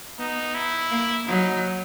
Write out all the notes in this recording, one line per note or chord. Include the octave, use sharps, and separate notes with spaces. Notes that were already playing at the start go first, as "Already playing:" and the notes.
B3 D#4
E4
A#3
F#3 D#4